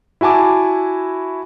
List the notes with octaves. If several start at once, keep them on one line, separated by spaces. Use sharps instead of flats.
E4 F#4 G#5 A5 D6